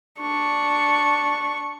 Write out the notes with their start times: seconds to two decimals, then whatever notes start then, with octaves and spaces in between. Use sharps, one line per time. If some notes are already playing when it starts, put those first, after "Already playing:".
0.20 D4 C#6